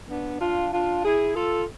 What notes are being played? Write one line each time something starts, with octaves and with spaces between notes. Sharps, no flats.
B3 D4
D4 F4
D4 F4
E4 G#4
F4 A4